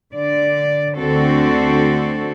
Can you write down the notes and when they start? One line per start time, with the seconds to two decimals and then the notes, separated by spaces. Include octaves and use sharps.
0.13 D3 D5
0.97 D2 D3 C4 F#4 A4